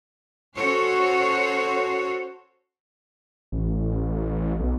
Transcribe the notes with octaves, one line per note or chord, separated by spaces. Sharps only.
C#4 F#4 A4 C5 C#5
A1
B1